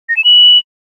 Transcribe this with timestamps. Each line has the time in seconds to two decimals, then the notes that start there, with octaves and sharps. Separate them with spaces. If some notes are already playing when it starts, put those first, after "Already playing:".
0.09 A#6
0.17 E7
0.24 F#7